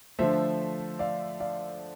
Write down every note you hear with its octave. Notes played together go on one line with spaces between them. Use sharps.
D3 F3 A3 C5 E5
D5 F5
D5 F5